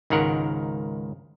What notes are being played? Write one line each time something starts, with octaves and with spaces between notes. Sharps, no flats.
C#2 G#2 D#3 A#4 F#5